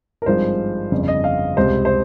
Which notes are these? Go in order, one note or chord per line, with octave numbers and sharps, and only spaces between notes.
A#4
G#1 G2 F3 G#3 C5
G1 F2 C#3
D#5
F5
C#2 C3 G3 C5
C5